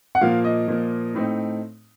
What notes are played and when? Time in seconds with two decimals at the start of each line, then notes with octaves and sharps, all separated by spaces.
0.15 F#5
0.21 A#2 F3 A#3 F5
0.44 D#5
0.68 A#2 F3 A#3
1.14 A2 A3 C4 D#4